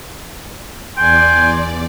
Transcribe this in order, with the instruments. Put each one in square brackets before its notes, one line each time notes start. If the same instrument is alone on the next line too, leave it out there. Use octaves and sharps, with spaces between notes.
[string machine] E2 D5 [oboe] G5 [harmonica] G#5 C6